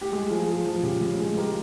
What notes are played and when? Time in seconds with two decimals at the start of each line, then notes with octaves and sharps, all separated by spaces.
0.01 G4
0.12 G#3 G#4
0.30 F3 G#4
0.48 F3
0.66 F3
0.83 C#3 G4
1.01 C#3 G4
1.19 G#3 G#4
1.37 G#3 G4 A#4